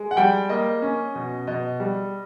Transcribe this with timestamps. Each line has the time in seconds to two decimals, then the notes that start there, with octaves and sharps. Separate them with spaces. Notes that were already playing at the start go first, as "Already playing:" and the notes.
Already playing: G#3
0.11 F#5
0.17 G3 G5
0.49 A#3 D#5
0.82 C#4
1.15 B2
1.47 B2 D#5
1.80 G3